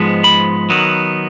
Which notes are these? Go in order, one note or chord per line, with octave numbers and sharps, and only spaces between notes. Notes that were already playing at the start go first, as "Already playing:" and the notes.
Already playing: G#2 F3 G#3 B3
B5
D#3 F#3 B3